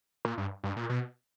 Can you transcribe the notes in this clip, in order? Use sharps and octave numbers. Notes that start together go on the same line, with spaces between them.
A#2
G2
G2
A#2
B2